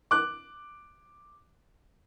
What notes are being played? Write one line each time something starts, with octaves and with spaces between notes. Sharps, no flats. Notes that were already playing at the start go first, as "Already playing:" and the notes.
D6 F#6